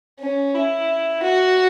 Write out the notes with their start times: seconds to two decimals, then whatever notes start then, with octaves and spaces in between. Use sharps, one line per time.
0.20 C#4
0.55 E4
1.23 F#4